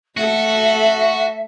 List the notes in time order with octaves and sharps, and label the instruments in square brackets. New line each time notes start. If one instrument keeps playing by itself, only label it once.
[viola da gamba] A3 A4 [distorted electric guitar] F#4 [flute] E5